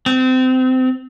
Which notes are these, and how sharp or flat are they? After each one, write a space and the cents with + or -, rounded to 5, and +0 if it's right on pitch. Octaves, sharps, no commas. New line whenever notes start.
C4 -25